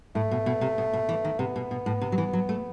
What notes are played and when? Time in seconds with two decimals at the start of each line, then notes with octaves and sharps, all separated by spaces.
0.15 A2 A3
0.31 B2
0.46 B2
0.61 C3
0.78 B2
0.93 B2
1.09 E3
1.25 D#3
1.39 C3 B3
1.56 B2
1.71 B2
1.86 A2
2.02 C3
2.12 F#3
2.18 E3
2.33 F#3
2.49 A3